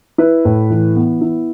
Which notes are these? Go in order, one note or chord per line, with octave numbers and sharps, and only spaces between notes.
E4 B4
A2
E3
B3
E4